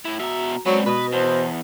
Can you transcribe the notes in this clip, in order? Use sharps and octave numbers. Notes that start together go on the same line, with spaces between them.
A2 E4
B2 F#4 E5 A#5
F#3 G#3 B3 C4 D5 A5
B2 B4 B5 D#6
E2 C5 A5